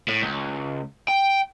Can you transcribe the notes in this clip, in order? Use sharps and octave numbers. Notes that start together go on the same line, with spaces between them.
A2
C#2
G5